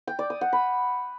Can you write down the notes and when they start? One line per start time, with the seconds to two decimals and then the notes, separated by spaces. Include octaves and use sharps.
0.07 G5
0.19 D5
0.30 D#6
0.41 F#5
0.53 B5